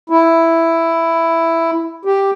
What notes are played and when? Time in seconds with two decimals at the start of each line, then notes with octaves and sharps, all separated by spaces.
0.10 E4
2.05 G4